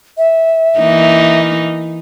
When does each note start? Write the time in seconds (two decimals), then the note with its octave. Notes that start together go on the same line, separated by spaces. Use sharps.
0.18 E5
0.79 E3 A#3 D#4